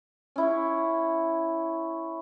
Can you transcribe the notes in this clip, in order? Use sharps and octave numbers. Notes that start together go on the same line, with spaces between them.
C#4 E4 C#5